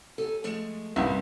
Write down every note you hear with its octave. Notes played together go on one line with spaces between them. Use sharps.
D#2 A4 G#5
F3 G#3 A3
C2 G2 A#2 C#4